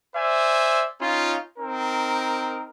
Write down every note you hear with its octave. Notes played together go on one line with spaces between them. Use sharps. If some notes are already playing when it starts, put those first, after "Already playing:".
C5 D5 E5 G#5
C#4 D#4 F4
C4 D#4 A#4